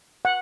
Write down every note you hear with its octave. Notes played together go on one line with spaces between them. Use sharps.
F#5